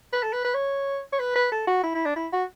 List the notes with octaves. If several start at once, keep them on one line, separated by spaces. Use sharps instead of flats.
B4
A4
B4
B4
C#5
C#5
B4
B4
A4
F#4
E4
E4
D4
E4
F#4